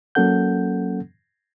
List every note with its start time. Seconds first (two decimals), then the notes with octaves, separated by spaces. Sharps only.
0.15 F#3 A#3 C#4 A4 F#5 G6